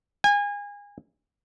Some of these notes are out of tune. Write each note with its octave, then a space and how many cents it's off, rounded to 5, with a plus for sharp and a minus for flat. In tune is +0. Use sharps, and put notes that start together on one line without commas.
G#5 -30